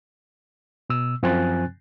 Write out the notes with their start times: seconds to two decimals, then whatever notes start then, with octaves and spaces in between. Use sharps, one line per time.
0.90 B2 E6
1.23 F#2 F3 C4 G#5 F#6 A6